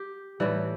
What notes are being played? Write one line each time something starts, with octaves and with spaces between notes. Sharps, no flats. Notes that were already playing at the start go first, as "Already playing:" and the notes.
Already playing: G4
A2 E3 G3